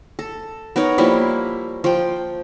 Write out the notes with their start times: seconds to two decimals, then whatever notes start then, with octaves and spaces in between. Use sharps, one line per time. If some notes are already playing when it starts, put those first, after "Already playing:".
0.19 A4
0.76 B3 D#4 A#4 C#5
0.98 F3 G3 A#3 E4
1.84 F3 G5